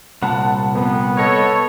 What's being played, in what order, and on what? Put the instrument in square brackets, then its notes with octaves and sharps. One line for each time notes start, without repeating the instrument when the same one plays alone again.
[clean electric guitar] C2 A#2 [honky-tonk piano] F#5 A5 B5
[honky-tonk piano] F2 [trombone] B3
[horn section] A4 C#5 [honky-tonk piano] D#5 G#6 A#6